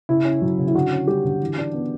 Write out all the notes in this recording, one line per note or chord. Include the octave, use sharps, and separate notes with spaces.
C#3 E4
C#4
F#3
C#3
E4
D3 F#4
C#4
G3 G4
D3
E3
D4
B3